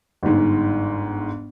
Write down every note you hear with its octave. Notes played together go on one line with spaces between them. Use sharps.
G1 G#2